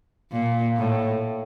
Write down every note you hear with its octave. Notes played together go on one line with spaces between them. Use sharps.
A#2
A2